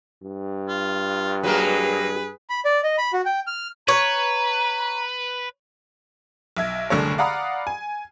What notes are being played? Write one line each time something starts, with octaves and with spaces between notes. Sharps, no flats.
G2
F4
F#3 A#3 G#4 A#4 B4
B5
D5
D#5
B5
F#4
G5
F6
B4 C#5 A#5
B1 E5 G#6
F#1 C2 D3 A3 C#5
D5 F5 F#5 A#5 B5 D#6
G#5